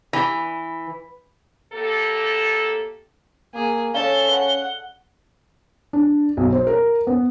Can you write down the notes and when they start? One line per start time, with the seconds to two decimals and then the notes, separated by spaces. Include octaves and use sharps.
0.13 E3
1.73 A2 A#3 G4 A4
3.54 A#3 G#4
3.94 C#4 A4 C#5 D5 F5 G7
4.31 F#5
5.93 D4
6.37 B1
6.53 C5
6.67 A#4
7.07 B3